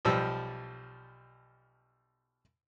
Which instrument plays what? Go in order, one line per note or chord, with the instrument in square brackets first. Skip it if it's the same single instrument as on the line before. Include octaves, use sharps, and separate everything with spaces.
[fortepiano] B1 F3 G3 E6